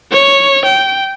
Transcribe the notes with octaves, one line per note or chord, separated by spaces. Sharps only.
C#5
G5